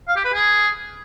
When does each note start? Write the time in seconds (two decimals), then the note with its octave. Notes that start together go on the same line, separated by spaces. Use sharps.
0.08 F5
0.16 G4
0.24 B4
0.33 G#4